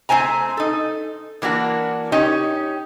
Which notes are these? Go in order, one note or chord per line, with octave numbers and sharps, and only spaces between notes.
A3 C4 E4 C5 G#5 A#5
D#4 A4
E3 A#3 D4 F#4
C#4 D#4 G4 C#5